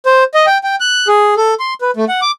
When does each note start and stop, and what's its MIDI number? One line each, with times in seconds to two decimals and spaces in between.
0.06 0.24 72
0.34 0.46 75
0.47 0.58 79
0.64 0.75 79
0.80 1.08 90
1.08 1.34 68
1.37 1.54 69
1.60 1.74 84
1.81 1.91 71
1.97 2.05 57
2.08 2.20 78
2.22 2.31 86